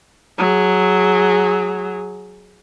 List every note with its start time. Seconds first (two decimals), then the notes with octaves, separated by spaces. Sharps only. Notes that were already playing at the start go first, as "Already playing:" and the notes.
0.38 F#3 G#4